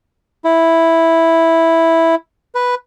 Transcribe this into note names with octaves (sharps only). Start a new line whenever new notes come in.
E4
B4